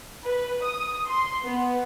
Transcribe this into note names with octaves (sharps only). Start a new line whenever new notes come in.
B4
D#6
C6
B3